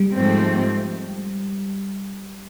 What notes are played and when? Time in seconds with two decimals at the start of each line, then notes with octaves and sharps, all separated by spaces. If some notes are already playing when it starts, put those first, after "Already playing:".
Already playing: G3
0.15 G#2 F3 A3 C4